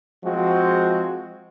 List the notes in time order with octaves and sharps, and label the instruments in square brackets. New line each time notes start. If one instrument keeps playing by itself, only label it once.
[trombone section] F3 G#3 C4 F#4